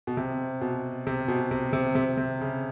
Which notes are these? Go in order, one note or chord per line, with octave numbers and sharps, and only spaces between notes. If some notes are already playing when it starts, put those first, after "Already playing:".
B2
C3
B2
C3
B2
C3
C3
C3
C3
C#3